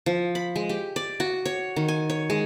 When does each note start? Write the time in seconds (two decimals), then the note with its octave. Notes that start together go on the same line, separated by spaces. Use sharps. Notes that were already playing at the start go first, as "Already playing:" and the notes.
0.06 F3
0.35 B5
0.56 G#3
0.69 G4
0.96 D5
1.20 F#4
1.45 C#5
1.76 D#3
1.88 G#5
2.10 C#5
2.30 G#3